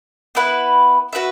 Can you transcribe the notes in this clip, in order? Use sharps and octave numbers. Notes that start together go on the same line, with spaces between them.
B3 E4 B4 F#5
F#4 B4 E5